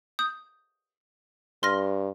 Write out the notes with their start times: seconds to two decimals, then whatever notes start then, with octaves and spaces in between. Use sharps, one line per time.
0.19 D#6 G6
1.63 G2 C6 F6 A#6